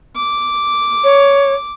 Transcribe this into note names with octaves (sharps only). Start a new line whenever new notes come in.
D6
C#5